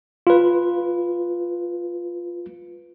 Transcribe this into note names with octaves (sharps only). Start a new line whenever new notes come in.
F4 B4